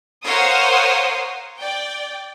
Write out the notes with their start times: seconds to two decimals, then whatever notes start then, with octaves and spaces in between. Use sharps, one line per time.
0.23 A#4 C5 C#5 F5 F#5 D#6
1.58 D5 G5